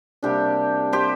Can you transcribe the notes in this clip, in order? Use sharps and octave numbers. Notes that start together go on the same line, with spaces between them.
C3 G3 A#3 D4 G4
G4 C5